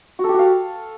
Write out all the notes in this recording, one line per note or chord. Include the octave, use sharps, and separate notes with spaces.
F#4
A4
G4
F#4
F5